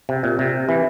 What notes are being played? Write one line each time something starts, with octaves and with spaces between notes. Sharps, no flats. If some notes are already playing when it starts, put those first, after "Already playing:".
C3
A#2
C3
E3